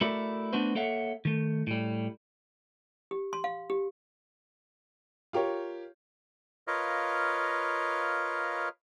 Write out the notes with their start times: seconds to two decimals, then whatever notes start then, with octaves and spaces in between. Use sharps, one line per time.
0.01 A3 E4 F#4 A#4 D5
0.53 A3 B3 D4 F#4 B4 C5
0.75 A#3 A4 C#5 E5 F#5
1.25 D#3 A3
1.67 A2 G3
3.11 G4
3.33 C6
3.44 F5
3.70 G4
5.33 F4 G4 A#4 C#5
6.67 F4 A#4 B4 C#5 D#5 F5